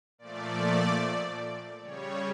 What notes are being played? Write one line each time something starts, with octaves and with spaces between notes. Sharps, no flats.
A#2 F3 A3 D5
C#3 G3 C#5